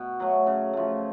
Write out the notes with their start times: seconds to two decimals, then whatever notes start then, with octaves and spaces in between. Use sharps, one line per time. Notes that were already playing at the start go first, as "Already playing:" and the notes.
Already playing: B2
0.20 F#3 A3
0.47 C#3
0.73 F3 A3